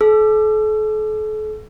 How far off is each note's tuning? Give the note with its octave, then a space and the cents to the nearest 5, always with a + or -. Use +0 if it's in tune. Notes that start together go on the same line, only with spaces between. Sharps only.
A4 -40 E6 +30